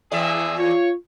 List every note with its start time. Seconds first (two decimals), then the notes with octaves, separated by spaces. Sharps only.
0.12 E2 G#4 D5 E5
0.58 F4 C#5